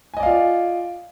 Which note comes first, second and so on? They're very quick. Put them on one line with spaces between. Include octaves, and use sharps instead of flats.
G#5 D#5 D5 F5 F4